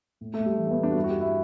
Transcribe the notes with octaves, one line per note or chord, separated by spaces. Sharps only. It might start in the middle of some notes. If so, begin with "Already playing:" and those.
A2
A3
A2
G3
E3
A3
B3
E3
D4
F#4
G2 E4
F#4
G4
G2
E4